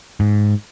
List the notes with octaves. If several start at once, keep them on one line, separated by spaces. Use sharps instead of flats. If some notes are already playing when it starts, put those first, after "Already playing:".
G#2